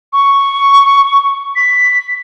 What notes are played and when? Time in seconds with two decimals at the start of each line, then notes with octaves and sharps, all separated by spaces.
0.13 C#6
1.56 B6